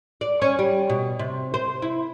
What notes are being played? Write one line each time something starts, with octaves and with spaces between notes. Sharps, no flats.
D5
C#4
G3
B2
C3
C5
E4